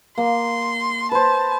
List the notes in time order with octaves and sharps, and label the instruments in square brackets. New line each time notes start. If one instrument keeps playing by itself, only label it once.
[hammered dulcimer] A#3 [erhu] C6
[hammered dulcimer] B4 C5 [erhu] A5